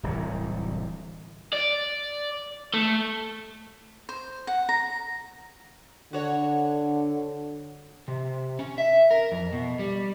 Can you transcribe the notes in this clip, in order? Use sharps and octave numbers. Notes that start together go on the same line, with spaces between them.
D1 C2 C3 E3
D5
A3
C5
F#5
A#5
D3 F#4 C#5
C3
C#4
E5
A#4
F2
B2
G3